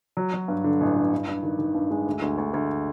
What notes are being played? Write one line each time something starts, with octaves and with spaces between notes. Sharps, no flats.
F#3
F#3
G2
D3
A1
D3
G2
G2
D#3
D#3
G2
G#3
D2
D2
D2
D2